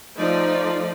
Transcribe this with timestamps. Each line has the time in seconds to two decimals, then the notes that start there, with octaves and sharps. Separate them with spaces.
0.17 F3 A3 D#4 D5